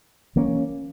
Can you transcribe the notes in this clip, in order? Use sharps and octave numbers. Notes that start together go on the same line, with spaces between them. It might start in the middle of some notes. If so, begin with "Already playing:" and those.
E3 A#3 C#4